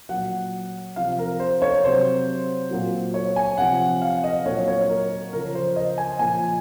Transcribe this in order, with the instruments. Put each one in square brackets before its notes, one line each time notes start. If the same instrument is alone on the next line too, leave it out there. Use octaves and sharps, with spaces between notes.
[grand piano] A#2 F#3 F#5
C3 F3 F5
A#4
C5
C#5
C3 F#3 C5
A#2 F#3
C#5
G#5
C3 F3 F#5
F5
D#5
A#2 C#5
F#3
C#5
A#4
C#3 F3 A#4
C5
D#5
G#5
A#2 F3 G#5